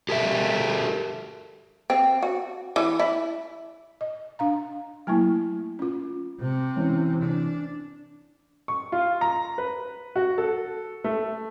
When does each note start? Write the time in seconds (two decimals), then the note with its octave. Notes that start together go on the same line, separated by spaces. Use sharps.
0.09 G4 A4 A#4 E5
1.90 C4
2.22 F#4
2.76 E3
2.99 E4
4.01 D#5
4.39 D4 F5 A#5
5.07 F#3 A3 A#3 E4
5.79 C#4 F4
6.41 C3
6.76 E3 C#4
7.23 D4
8.68 C#6
8.92 F4
9.21 A#5
9.58 B4
10.16 F#4
10.38 A4
11.04 A3